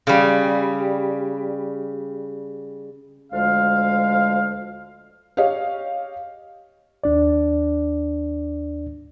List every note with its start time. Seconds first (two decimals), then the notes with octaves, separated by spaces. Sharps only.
0.07 C#3 G3
3.32 D2 F3 G#3 F5
5.37 G4 C#5 D#5 F5
7.04 D#2 D4 D5